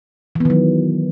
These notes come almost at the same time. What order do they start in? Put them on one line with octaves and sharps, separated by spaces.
E3 B3 D#3 F#3